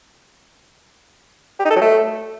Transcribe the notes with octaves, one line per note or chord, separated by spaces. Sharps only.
G4
D#4
A4
F#3
A3